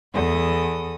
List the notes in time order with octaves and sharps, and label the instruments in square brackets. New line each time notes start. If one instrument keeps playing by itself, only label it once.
[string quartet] E2 A4 D#6